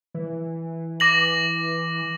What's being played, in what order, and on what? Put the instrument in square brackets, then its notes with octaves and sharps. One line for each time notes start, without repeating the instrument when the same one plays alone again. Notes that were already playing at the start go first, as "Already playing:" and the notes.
[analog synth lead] E3
[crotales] D6 A#6 F#7